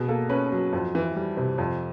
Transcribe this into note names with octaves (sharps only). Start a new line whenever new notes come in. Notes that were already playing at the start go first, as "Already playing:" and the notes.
Already playing: B2 G#4
A#3 A4
C#4 B4
F#3
F2
E3
G3
C3
F2